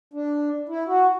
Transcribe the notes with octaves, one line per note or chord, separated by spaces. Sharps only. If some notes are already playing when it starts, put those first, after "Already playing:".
D4
E4
F#4